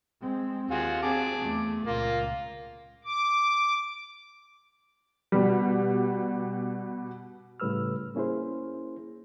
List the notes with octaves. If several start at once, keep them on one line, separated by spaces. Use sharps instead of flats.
G#3 C4
D#2 F4 F#4 G#4
C4 G#4 A5 D6
E2 A3
C#2 A#2 A#3 F4
D6
B2 G3
A2 C#3 G3 B4 E6 F6
A#3 C#4 E4 G#4 C5